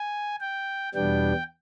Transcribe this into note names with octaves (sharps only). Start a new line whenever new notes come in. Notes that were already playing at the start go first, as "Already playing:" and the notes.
Already playing: G#5
G5
E2 B2 G3 B3 D4 G5